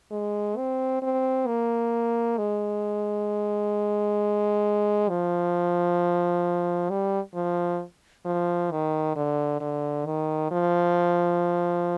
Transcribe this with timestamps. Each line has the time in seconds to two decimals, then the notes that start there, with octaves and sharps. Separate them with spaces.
0.11 G#3
0.57 C4
1.02 C4
1.47 A#3
2.37 G#3
5.09 F3
6.90 G3
7.34 F3
8.25 F3
8.71 D#3
9.16 D3
9.60 D3
10.05 D#3
10.51 F3